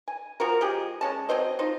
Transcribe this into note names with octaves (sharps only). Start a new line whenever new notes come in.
G#5
F3 F#4 A#4
F3 G#3 G4 G#4
G#3 C#4 A5
F#3 C4 C5 D#5
D#4 F4 C5